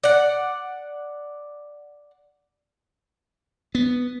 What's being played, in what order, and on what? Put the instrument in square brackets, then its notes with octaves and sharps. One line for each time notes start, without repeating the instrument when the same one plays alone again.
[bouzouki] D5 F#5
[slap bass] B3